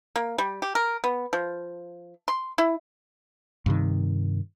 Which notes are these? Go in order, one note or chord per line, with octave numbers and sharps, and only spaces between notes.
A#3
G3
G4
A#4
B3
F3
C6
E4
G2 C3 D#3